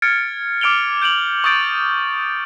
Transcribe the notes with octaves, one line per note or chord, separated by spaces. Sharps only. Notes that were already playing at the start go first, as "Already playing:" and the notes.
F6 G#6 A6 C#7 D7
D6 F6 D7 F7 G7
G6 D7 F7 F#7
C#6 D#6 G6 A6 D7